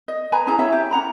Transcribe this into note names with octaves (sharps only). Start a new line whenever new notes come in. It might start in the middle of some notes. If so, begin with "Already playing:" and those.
D#5
B4 G#5 A#5 B5
C#4 E4 G#4 A#5
E4 F4 C#5 E5
G4
C#4 F#5 A#5 B5